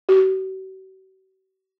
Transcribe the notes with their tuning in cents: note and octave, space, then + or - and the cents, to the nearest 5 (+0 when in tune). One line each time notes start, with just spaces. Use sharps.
F#4 +45